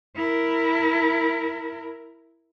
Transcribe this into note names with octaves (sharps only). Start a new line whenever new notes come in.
E4 A#4